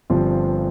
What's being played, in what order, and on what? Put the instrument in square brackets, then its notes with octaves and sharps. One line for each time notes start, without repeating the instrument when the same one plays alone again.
[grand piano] G1 G2 F3 C4